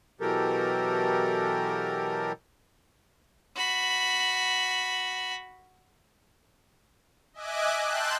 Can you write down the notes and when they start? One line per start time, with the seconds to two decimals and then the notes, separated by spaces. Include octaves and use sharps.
0.21 B2 E3 F#3 G4 A4 A#4
3.55 F#4 B5
7.33 D#5 E5 G#5 D6 F#6
7.84 G5 A5 C6 E6 F#6 G6